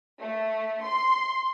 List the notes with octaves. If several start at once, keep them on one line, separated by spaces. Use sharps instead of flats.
A3
C6